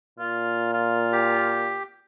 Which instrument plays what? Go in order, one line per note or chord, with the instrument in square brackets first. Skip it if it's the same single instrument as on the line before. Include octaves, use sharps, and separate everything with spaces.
[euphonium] A#2 [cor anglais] F4
[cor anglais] F4
[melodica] G4